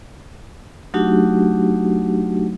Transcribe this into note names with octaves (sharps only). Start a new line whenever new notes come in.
F#3 A3 D4 D#4 F#4 G4